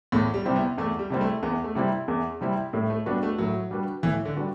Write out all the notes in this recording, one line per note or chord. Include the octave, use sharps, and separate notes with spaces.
E2 A2
G3
C3 G3 C4 E4
B3
E2 A3
G3
C3 G3 C4 E4
A3
E2 B3
A3
C3 G3 C4 E4
E2
C3 G3 C4 E4
A2 G3
A3
G3 B3 D4 F#4 B4
A3
A2 F#3
G3 D4 F#4 B4
A2 E3
D3
G3 D4 F#4 B4